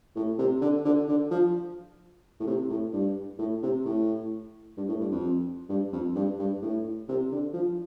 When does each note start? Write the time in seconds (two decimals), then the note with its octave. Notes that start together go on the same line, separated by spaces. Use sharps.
0.16 A2
0.39 C3
0.61 D3
0.85 D3
1.08 D3
1.31 F3
2.40 A2
2.47 C3
2.70 A2
2.93 G2
3.39 A2
3.63 C3
3.86 A2
4.77 G2
4.89 A2
5.01 G2
5.12 F2
5.69 G2
5.93 F2
6.16 G2
6.39 G2
6.62 A2
7.09 C3
7.32 D3
7.54 F3